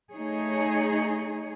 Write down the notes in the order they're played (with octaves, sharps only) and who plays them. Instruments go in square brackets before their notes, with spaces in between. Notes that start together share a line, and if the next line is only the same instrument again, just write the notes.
[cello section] A3 D#4 G#4 C#5